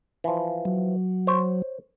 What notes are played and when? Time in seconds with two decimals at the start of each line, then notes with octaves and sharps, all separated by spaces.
0.24 E3 F3
0.65 F#3
1.27 C5 C#5